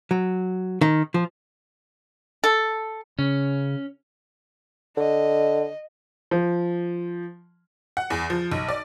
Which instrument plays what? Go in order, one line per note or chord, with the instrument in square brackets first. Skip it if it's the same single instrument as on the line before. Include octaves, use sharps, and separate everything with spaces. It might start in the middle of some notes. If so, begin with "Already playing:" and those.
[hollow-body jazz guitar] F#3
D#3
F3
[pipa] A4
[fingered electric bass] C#3 [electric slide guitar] C#4
[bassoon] D3 [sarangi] D#5
[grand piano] F3
[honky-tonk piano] F#5
E2
F3
B1
D5